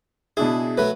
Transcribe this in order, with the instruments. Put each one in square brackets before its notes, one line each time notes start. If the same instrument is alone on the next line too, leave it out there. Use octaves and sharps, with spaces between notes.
[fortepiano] B2 D4 G#4 [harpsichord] E4
[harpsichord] F#3 A3 [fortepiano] B4